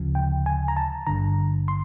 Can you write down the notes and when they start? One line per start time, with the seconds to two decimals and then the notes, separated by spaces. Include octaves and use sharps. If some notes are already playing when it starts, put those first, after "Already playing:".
Already playing: D2 C#3 F3
0.15 G5
0.46 G#5
0.68 A#5
0.77 A5
1.07 G#1 G2 D3 A#5
1.68 C6